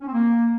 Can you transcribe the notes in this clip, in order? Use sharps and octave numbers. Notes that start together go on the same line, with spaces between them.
C#4
C4
A#3